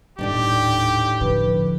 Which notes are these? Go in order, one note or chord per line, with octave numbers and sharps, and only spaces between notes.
D#1 A2 D4 D#4 G4
D3 F3 B4